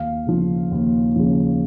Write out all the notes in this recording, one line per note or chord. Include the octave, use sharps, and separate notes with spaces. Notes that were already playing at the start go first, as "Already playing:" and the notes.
Already playing: D#2 F5
C#3 F3
D#2
C#3 F3